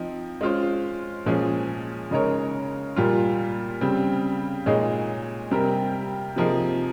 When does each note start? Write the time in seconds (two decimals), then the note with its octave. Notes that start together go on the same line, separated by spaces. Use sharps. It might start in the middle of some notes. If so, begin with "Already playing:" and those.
Already playing: F3 C4 D#4
0.41 G#3 C#4 F4 C5
1.26 A#2 F3 G#3 C#4 G#4
2.11 C#3 G#3 D#4 A#4 C#5
2.96 A#2 G3 A#3 F4
3.81 C#3 G3 C4
4.66 A#2 G#3 D#4 G#4 C#5
5.51 C3 G3 C4 G4 A#4
6.36 C3 F3 A#3 D#4 G#4